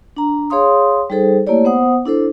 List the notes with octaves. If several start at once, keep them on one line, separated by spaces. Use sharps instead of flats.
D4 A#5
G#4 C#5 F5 C6 D#6
G3 D#4 G#4 A4 C5
A3 A#3 E4 G4 C#5 D5
B3 C5 F#5 D#6
D4 E4 A4 C5